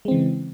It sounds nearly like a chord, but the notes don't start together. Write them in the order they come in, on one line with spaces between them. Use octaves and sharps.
G#3 C4 E3 C#3